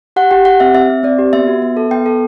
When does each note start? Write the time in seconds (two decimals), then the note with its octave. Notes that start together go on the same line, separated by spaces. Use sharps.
0.16 G4 F#5
0.31 G4 G5
0.45 G4 F#5
0.60 C4 E5
0.74 C4 E5
0.90 C4
1.03 C4 D5
1.19 G4
1.33 B3 E5
1.48 F#4
1.62 B3
1.77 A4
1.91 B3 G5
2.06 A4